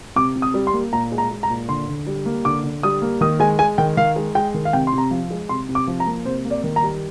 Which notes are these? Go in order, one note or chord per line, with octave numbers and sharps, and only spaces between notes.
C3 D6
C3
D#6
G3
C6
A#3
A#2 A#5
G#3
A#5
G#3
A#5
A#2
D3 C6
D3
G3
A#3
D3 D6
D3
G3 D#6
A#3
D#3 D#6
G#3 G#5
G#3 G#5
D#3 G5
D#3 F5
G#3
G#3 G5
D#3
F5
C3 G5
C6
C3
A#5
F3
G#3
C3 C6
C3
D6
F3
A#5
A#3
C3 C5
A#3
D5
D#3
A#5
G3